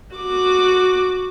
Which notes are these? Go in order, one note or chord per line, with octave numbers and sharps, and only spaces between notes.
F#4 D6